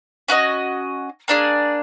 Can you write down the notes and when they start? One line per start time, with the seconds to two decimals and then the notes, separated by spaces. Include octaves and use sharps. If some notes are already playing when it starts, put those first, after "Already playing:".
0.28 C#4 F#4 A#4 D#5
1.28 A#3 D4 F4 G#4